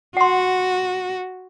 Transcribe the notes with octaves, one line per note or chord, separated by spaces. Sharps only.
F#4 F#5 C6